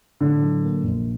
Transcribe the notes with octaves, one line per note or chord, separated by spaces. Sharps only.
A2 D3
F#3
A#3
A#1